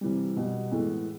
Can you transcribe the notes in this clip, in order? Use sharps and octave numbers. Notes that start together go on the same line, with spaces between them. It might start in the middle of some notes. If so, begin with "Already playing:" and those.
C3 E3 G3
B2 G3 B3
A2 E3 G#3 B3